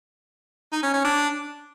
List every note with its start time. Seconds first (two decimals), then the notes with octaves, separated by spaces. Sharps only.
0.72 D#4
0.83 C#4
0.94 C#4
1.04 D4